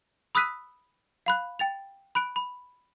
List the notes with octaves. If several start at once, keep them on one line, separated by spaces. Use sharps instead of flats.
B5 D#6 E6 F#6 B6 D#7
F5 B5 F#6
G5 A6 F7
B5 F#6 D7
B5